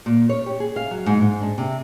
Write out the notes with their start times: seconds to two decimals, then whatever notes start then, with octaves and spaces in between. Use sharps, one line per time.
0.06 A#2
0.29 C#5
0.46 G4
0.60 G#4
0.76 F5
0.91 F#3
1.06 G#2
1.21 G#2
1.42 D4
1.58 C3